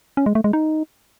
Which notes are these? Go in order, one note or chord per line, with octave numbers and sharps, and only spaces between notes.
C#4
G#3
A3
G#3
D#4